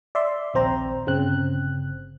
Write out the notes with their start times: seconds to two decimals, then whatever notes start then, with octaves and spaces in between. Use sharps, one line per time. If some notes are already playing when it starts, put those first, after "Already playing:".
0.15 D5 E5 C6
0.54 A#1 D#2 C4 C5 A#5
1.07 G1 C#3 C4 F#6